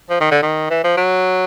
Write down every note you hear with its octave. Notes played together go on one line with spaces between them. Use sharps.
F3
D#3
D3
D#3
E3
F3
F#3